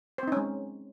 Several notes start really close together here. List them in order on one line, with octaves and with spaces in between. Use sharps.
C5 C4 D#4 C#4 G#3